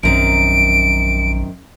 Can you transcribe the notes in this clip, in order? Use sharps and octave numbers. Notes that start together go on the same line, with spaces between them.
A#1 F#2 D#3 C4 D7